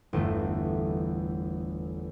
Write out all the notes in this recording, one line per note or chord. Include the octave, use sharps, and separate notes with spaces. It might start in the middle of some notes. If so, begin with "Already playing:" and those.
G1 E2 A3